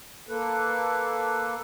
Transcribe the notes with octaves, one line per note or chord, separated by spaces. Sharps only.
A#3 A4 B4